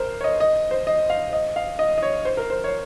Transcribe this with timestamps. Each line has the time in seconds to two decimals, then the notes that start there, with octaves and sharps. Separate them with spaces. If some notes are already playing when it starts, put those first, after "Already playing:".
Already playing: A#4 C5
0.21 C#5
0.24 D#5
0.40 D#5
0.71 C5
0.87 D#5
1.10 F5
1.33 D#5
1.56 F5
1.79 D#5
1.98 D#5
2.03 C#5
2.25 C5
2.37 A#4
2.50 C5
2.64 C#5